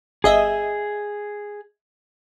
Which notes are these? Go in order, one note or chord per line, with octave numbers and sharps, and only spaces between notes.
G1 G#4 D#5 E5